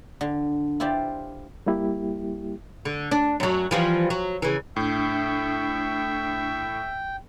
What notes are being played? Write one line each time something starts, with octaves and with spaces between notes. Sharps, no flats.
D3
E4 F4 G4 C5 D5
G3 A#3 E4 G4
D3
D4
F#2 F#3
E3 F3 G3
F#3
C#3 E3
A2 D4 E5 G5